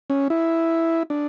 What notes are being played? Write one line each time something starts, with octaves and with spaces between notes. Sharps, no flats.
C#4
E4
D4